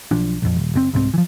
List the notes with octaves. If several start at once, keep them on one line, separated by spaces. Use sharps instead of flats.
B1 F3 D4
A#1 F2
D#1
F#1 C3 C4
C2 G#2 G3 C4
E3 F3